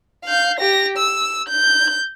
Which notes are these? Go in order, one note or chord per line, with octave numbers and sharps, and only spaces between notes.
F5 G6
G4 A#6
E6
G6